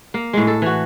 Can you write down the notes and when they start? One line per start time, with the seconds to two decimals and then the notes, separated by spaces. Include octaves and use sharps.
0.14 A#3
0.33 A2 G#3
0.47 A4
0.62 E3 F#4